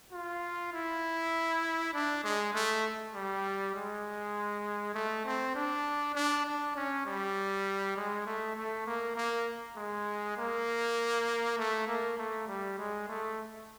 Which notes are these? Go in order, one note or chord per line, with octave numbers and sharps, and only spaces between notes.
F4
E4
D4
G#3
A3
G3
G#3
A3
C4
D4
D4
D4
C#4
G3
G#3
A3
A3
A#3
A#3
G#3
A#3
A3
A#3
A3
G3
G#3
A3